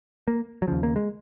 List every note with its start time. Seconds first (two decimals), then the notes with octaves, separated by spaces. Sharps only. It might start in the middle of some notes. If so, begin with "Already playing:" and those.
0.28 A#3
0.62 F#3
0.67 D#2 C#3 F3
0.83 A#3
0.96 G#3